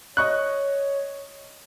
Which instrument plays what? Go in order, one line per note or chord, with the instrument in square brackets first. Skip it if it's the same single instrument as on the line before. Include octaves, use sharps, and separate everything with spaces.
[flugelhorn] C#5 [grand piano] D#5 C#6 F#6